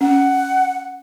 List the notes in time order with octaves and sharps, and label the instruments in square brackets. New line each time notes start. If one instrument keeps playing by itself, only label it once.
[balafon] C#4 [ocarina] F#5